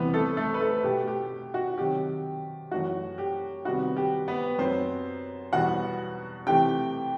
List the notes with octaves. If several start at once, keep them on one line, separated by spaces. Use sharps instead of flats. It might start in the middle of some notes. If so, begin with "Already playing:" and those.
Already playing: E2 C3 E3 G3 B3 B4
A3 A4
A3 A4
B4
A3 A4
B2 A3 G4
G4
F#4
C3 D#3 F#3 G4
F#2 E3 A3 F#4
G4
C3 D#3 G3 B3 F#4
G4
B3 B4
F#2 F#3 B3 C4 C5
E2 B2 G3 B3 F#4 F#5
C3 E3 A3 G4 G5